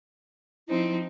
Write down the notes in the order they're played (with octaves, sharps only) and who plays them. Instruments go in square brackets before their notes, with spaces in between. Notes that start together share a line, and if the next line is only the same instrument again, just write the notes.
[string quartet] F3 C4 D#4 [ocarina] E4